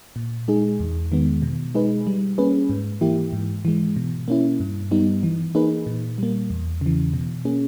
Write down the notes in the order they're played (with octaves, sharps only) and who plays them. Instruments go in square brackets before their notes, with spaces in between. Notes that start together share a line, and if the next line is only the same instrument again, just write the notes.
[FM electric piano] A#2
G#3 D#4 G#4
E2
D#3 G#3 B3
B2
G#3 D#4 G#4 B4
G3
A#3 C#4 G#4 B4
G#2
E3 A#3 E4 G4
G#2
E3 G#3
B2
A#3 C#4 E4
G2
G3 B3 D#4
E3
A#3 D#4 G#4 B4
A#2
G3 A#3
E2
C#3 E3
B2
A#3 C#4 G#4